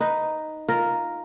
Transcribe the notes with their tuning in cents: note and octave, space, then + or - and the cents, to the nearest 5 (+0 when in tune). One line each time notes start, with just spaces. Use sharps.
D#4 +0 B4 +0
F4 +0 A#4 +0